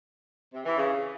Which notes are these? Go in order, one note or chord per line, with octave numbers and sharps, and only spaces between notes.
C3
E3
C#3